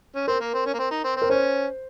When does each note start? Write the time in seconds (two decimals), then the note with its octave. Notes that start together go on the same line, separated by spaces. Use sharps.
0.15 C#4
0.28 C4 A#4
0.40 A#3
0.54 C4
0.66 C#4
0.74 A#3
0.79 C4
0.91 D#4
1.04 C4
1.17 C4
1.22 A#4
1.30 C#4 C5